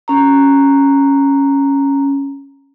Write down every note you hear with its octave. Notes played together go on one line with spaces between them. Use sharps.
C#4 A#5